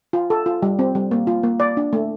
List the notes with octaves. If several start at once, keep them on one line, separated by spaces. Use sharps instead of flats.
F4
A4
F4
G3
C4
G3
A#3
F4
A#3
D5
D4
A3